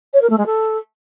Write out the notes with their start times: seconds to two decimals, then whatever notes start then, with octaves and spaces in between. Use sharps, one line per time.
0.13 C#5
0.21 A#4
0.29 A3
0.38 G#3
0.46 A4